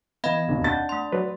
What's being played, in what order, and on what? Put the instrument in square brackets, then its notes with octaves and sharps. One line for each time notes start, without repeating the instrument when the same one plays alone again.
[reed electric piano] E3 B3 [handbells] D#5 F5 B5
[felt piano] F1 D#2 B2
[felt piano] D4 A6 [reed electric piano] F#5 G6
[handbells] A3 C6
[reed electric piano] F#3 B4 D5